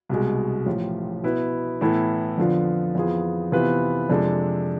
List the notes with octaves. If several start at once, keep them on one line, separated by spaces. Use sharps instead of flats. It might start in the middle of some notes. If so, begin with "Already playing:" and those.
C2 B2 G#3
A1 A2 F3
B2 B3 E4 B4
A2 E3 B3 E4 A4
F2 D3 F3 B3 F4
F2 E3 B3 F4 G#4
C3 E3 B3 F4 B4
F2 C3 G#3 D4 A4